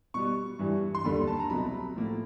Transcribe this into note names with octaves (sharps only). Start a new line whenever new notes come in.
B2 G3 B3 C#6
G2 E3 G3
C6
D#2 D3 G3 B5
A5
A#5
C2 B2 F#3 B5
A2 F3 A#3